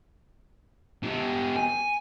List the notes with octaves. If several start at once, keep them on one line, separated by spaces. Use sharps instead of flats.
B3 G4
G#5